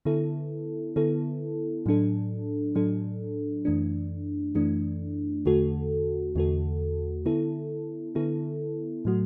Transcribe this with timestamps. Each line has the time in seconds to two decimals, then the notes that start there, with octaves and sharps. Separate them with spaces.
0.05 D3 B3 E4 A4
0.96 D3 B3 E4 A4
1.86 A2 F#3 D4 A4
2.75 A2 F#3 D4 A4
3.65 F#2 E3 A3 D4
4.55 F#2 E3 A3 D4
5.45 E2 D3 A3 F#4 A4
6.35 E2 D3 A3 F#4 A4
7.26 D3 B3 E4 A4
8.15 D3 B3 E4 A4
9.05 A2 F#3 A3 F#4